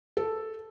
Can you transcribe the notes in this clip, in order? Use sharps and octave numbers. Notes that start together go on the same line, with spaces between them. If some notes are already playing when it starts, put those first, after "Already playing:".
A4